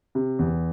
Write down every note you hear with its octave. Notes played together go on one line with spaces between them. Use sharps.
C3
E2